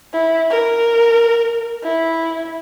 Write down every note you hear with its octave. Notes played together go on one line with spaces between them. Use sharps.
E4
A#4
E4